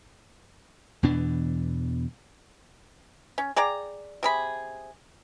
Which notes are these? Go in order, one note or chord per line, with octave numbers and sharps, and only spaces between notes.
E2 B2 E3 D4
C#4
G#4 D5 G5 A#5
C3 G#4 B5